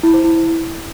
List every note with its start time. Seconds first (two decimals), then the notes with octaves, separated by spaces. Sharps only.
0.03 E4
0.14 C5
0.24 E4